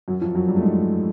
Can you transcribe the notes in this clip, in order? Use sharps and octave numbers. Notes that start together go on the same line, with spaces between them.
F#2 F#3
F2 F3
F#2 F#3
G2 G3
A3
G#2 G#3